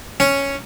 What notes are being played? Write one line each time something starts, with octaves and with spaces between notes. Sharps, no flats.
C#4